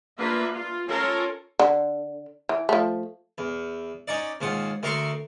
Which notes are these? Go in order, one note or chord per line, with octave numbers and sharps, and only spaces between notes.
A#3 D4 F4 B4 E5
F4
C#4 F4 A4 A#4 C#5
D3
E3
F3 A3
E2
C#4 D#4 D5
D#2 G#2 F4 F#5
D2 A3 A#4 C6 C#6